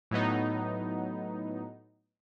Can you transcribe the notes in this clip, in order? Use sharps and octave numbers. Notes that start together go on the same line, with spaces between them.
A2 F#3 B3 D#4